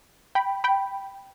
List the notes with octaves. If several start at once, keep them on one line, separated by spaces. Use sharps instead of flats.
G5 B5
G5 B5